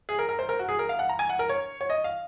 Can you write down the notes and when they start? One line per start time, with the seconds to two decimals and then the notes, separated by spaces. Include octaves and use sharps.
0.09 G#4
0.19 A#4
0.29 A#4
0.39 C5
0.49 A#4
0.59 F#4
0.69 G#4
0.79 A#4
0.89 F5
0.99 F#5
1.09 A#5
1.19 G#5
1.29 F#5
1.39 A#4
1.49 C#5
1.81 C#5
1.90 D#5
2.04 F5